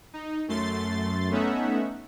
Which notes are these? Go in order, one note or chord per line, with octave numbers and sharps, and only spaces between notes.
D#4
F#2 A3 C6 A6
A3 B3 C#4 D#4 E5 F#5